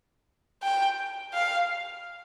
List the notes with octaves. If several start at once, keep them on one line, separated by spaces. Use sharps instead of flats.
G5
F5